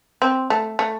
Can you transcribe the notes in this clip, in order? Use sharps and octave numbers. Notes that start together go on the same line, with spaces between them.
C4
A3
A3